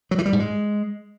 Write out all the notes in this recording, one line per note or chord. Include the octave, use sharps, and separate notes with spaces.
F#3
E3
G3
G#2
G#3